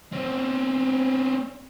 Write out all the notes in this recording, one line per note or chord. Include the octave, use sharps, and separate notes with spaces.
C4 C#4